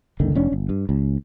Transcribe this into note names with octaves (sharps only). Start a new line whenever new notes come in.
F#1 C#2 D3 D#3
F1 C#4 D4
G1
G2
C#2